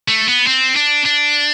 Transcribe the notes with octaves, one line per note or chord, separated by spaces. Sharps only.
A3
B3
C4
D4
D4